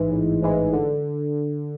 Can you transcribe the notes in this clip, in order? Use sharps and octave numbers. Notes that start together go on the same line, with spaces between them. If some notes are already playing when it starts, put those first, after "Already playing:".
Already playing: A1 G#2 E3 G#3
A1
G#2 E3 G#3
D3